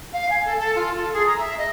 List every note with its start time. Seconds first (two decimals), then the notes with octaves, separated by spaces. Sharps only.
0.13 F5
0.30 G#5
0.45 A4
0.58 A4
0.75 F4
0.96 A4
1.13 G#4
1.26 A#5
1.38 E5
1.57 D#5